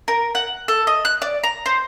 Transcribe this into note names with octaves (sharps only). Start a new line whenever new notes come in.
A#4
F#5
A4
D#5
F#6
D5
A#5
C5